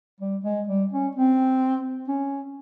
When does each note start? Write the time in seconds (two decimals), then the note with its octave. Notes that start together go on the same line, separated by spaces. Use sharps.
0.20 G3
0.44 G#3
0.67 G3
0.92 C#4
1.15 C4
2.08 C#4